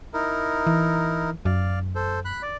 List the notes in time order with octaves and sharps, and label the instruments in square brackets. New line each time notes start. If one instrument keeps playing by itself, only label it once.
[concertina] D#4 E4 A#4
[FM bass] E3
[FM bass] F#2 [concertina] D5 F5
[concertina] A4 C5
B5 F#6
D5